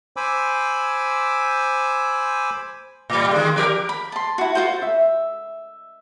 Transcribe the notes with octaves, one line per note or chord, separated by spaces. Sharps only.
C5 G#5 B5 D6 E6
A2 G3
D#3 G#3
F3 G4 A#4
B5
A5 C6
E4 F#4
F4 F#4 A4 C5
E5